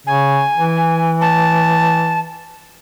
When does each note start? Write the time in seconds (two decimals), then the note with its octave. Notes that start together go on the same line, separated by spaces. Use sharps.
0.07 C#3 G#5
0.58 E3
1.21 A5